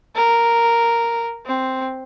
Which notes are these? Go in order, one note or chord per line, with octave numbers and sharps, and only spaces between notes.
A#4
C4